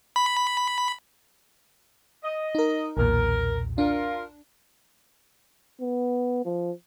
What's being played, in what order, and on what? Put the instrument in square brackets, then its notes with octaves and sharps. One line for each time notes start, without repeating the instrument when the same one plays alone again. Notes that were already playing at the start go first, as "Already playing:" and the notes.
[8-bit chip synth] B5
[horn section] D#5
[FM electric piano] D#4 A#4
[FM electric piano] B1 E2 A#2 [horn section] A#4
[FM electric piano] D4 [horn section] F4 A#4
[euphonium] B3
F3